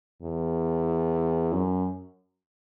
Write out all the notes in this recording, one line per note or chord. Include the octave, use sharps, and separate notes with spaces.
E2
F#2